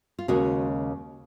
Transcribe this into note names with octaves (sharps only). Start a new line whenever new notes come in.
F4
D#2 C#3 G#3 F#4